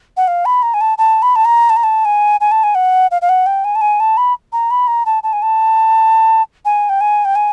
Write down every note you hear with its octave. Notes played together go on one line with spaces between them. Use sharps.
F#5
F5
B5
A#5
G#5
A5
A5
B5
A5
A#5
A5
A#5
A5
G#5
G#5
A5
G#5
F#5
F5
F5
F#5
G5
G#5
A5
G#5
A5
B5
A#5
B5
A#5
A5
A5
G#5
A5
G#5
G5
G#5
G5
G#5